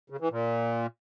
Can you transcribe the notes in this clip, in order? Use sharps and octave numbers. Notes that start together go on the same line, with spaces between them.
C#3
E3
A#2